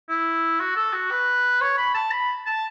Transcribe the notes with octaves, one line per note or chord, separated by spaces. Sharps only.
E4
F#4
A4
F#4
B4
C#5
B5
A5
B5
A5